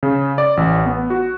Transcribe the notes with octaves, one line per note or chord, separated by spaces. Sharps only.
C#3
D5
A1
B3
F#4